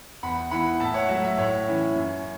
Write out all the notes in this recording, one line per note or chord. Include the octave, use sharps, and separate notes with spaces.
E2 F#5 B5
E3 B3 E4 F#5 B5
A2 E5 A5
C#5 F#5
F#3 A3 E5
E5
A2 C#5
E3 C#4 E4
F#2